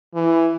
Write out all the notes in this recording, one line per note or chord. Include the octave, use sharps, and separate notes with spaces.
E3